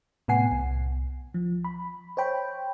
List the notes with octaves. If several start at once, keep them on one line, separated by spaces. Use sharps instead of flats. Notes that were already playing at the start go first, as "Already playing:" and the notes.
A2 C3 B3 F#5 G#5 C7
C2
F3
B5
C5 C#5 G5 B5